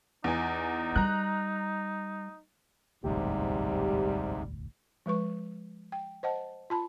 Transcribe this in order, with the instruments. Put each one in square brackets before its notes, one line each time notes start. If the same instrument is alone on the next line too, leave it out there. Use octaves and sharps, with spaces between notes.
[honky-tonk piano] E2 G#5 [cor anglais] D#4
[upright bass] G3 [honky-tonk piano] A#5 F#6
[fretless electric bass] E1 A1 D2 [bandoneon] G#2 C3 [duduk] G3 [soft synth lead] G4
[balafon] F3 G#3 B4 C#6
G5
C5 D#5 F#5 A5
F4 A5 B5